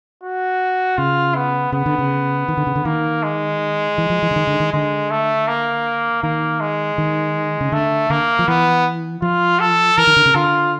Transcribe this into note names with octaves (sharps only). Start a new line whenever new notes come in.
F#4
C#3 F4
B3
C#3 B3
D3
C#3
D#3
D3
C#3
D3
D#3 A#3
G#3
E3
F3
E3
D3
D#3
D3
D#3
D3 G#3
A3
A#3
D#3 A#3
G#3
D#3
C#3
D3 A3
D3 A#3
F3
E3 B3
F3 F4
A4
E3 A#4
D#3
D3
C#3
D3 F4